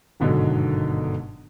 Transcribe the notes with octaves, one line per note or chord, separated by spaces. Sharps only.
G1 G#2 B2 D3 D#3 F#3